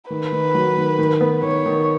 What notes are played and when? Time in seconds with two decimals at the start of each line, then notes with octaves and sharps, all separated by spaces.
0.10 D#3 B4
0.32 D#3
0.54 F#3
0.77 D#3
0.99 D#3
1.21 B3
1.43 D#3 C#5
1.66 D#3